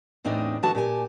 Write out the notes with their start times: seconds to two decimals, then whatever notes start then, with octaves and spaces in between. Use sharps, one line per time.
0.24 E2 A2 C4 D4 D#4 D#5
0.63 D3 E3 G#3 F#4 A5
0.75 A#2 G4 G#5